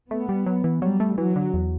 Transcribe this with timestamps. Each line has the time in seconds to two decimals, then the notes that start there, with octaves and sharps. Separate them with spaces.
0.10 A3 B3
0.29 G3
0.46 F#3
0.64 E3
0.82 F#3 G3
1.00 A3
1.17 E3 F#3
1.36 D3
1.54 E2